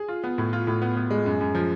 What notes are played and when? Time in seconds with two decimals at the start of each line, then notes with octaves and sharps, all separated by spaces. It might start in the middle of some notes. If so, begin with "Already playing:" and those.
Already playing: G#4
0.08 F4
0.24 B3
0.38 A2
0.53 F4
0.67 A2
0.82 B3
0.96 B3
1.11 G#3
1.26 F#2
1.41 F#2
1.55 F3